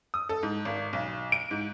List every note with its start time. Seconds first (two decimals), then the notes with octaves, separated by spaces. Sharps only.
0.14 D#6
0.29 A4
0.43 G#2
0.65 G#1
0.93 B1
1.32 D7
1.51 G#2